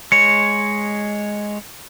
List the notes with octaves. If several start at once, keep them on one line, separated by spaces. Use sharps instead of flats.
G#3 C#5 C#7